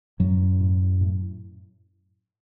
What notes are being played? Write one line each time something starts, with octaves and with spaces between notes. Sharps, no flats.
F#2 A2 F#3
A2
A2